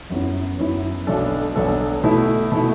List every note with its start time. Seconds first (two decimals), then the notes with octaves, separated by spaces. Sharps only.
0.10 F#2 F#3 B3 E4
0.58 F#2 F#3 B3 E4
1.07 B1 B2 F#3 D4 A4
1.55 B1 B2 F#3 D4 A4
2.03 B2 A3 E4
2.52 B2 A3 E4